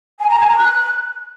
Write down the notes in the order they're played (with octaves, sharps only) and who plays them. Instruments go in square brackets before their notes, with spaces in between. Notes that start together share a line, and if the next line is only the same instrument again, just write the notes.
[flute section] G#5
A#5
G#5
A#5
F#6